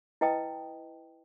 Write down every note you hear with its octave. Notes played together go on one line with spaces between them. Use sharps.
E4 B4 D#5 G5 A5 D#6